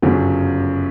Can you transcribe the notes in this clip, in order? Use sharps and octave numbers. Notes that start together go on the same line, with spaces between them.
G1 F#2 C#3